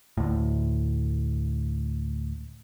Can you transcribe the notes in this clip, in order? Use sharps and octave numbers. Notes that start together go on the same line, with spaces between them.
D2 A2